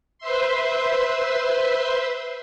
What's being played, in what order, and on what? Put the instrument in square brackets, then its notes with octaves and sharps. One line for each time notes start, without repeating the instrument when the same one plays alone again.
[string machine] B4 C5 E5 C6